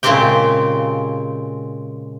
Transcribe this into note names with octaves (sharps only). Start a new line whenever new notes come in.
A#2 C#3 G#3 C4 G4 G5